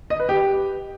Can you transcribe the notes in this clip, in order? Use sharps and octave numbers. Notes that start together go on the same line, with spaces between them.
D#5
B4
G4